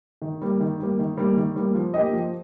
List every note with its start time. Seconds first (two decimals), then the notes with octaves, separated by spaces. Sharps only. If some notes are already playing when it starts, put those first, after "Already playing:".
0.22 D#3
0.42 G3 A#3
0.61 D#3
0.80 G3 A#3
0.99 D#3
1.17 G3 A#3
1.37 D#3
1.56 G3 A#3
1.75 F3
1.94 A#3 G4 D#5
2.13 F3